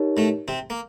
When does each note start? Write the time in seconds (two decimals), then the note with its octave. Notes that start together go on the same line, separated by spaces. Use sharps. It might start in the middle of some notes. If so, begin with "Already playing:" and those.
Already playing: D#4 G4 A#4 C#5
0.17 A2 A3
0.48 C3 C4
0.70 A#3